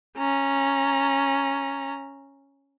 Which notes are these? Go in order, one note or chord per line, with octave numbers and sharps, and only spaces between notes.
C#4 A#5